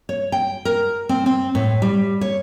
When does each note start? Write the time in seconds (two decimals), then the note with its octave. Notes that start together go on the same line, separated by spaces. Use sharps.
0.09 C#5
0.32 G5
0.65 A#4
1.09 C4
1.26 C4
1.55 A2
1.82 G3
2.21 C#5